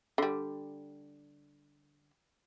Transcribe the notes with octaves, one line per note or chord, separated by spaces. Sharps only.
D3 G3